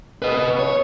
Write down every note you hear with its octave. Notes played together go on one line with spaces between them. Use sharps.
B4 D#5
C#5